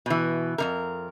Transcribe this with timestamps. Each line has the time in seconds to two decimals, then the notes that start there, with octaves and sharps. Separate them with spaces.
0.06 B2 E3
0.58 F2 C3 A#4